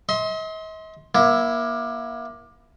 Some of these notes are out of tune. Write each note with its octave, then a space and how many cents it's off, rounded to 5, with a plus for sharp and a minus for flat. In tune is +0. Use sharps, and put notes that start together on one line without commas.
D#5 +45 C6 +10
A#3 +30 E4 +5